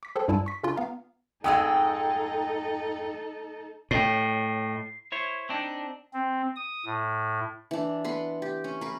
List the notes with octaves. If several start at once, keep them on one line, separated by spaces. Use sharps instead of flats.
D6 B6
G#4 A4 C5 G5 A5
G2 G3 E4 G#5 A5 E6
C#6 B6
C#3 C#4 D4 F4
B3 F5 A#5
F2 G#2 G#3 D#4 A4 G5 D#6 E6
A2 C#5 D#5 G5 C7
E4 C5 C#5
C4 D4 D#4
C4
D#6
A2
E3 D4
B3 B4 C6
G4
C#4
A#4 B4